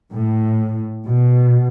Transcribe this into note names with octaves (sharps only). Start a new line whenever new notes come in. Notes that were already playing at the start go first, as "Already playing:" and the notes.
A2
B2